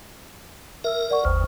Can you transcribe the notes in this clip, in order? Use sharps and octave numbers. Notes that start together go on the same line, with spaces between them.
A#4 E5 E6
D5 F#5 C#6
G1 D#2 C5 C#6 F6